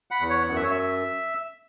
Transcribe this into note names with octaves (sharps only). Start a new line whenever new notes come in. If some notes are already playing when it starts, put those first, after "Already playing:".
F#5 B5
E2
C#5 F#5
F#2 F#5
E5
C#5
E5